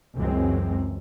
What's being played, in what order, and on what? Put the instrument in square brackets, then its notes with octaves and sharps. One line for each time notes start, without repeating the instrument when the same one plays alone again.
[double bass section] C#2 F#2 E3 F#3 G#3 C4